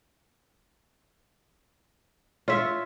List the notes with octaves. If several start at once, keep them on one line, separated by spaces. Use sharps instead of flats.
F4 C#5 E5